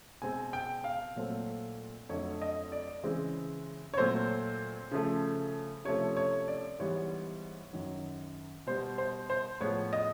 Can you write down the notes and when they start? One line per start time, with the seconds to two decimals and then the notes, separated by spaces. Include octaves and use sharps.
0.22 B2 G#3 C4 G#5
0.53 G5
0.84 F5
1.16 A#2 F#3 A3 C4
2.09 F2 D3 F#3 A3 C#5
2.42 D#5
2.72 D5
3.04 C#3 E3 G#3 C4
3.94 C#5
3.97 A#2 F#3 A3 C4 C5
4.91 C#3 F3 A3
5.85 C3 F3 A3 C#4 C#5
6.17 C#5
6.48 D5
6.79 G#2 E3 G3 B3 C#5
7.73 F#2 D#3 F#3
8.67 B2 G3 B3 C5
8.98 C5
9.30 C5
9.61 A2 F3 G#3 B3 C#5
9.93 D#5